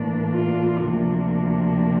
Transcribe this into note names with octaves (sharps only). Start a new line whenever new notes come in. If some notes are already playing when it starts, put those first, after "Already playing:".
Already playing: A2 E3 A#3 D4
F4
D2 C3 F3 A#3 D4